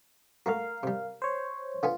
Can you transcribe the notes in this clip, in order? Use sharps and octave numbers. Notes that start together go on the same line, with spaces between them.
A3 A#3 F#4 A#4 F5
C3 G3
C5 C#5
D3 B3 F4 G#5